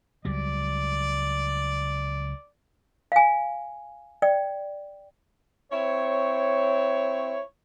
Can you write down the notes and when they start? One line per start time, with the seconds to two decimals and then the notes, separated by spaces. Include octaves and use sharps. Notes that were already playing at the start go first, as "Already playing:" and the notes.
0.25 C#2 F#3 G3 D5
3.12 F5 G#5
4.22 D5 G5
5.71 C4 E4 C#5